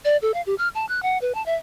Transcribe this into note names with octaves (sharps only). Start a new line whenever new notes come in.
D5
A4
F5
G4
F6
A5
F#6
F#5
B4
A5
E5